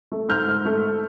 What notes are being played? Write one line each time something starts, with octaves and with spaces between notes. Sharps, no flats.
A3
G#2 F6 G6
G#2
A3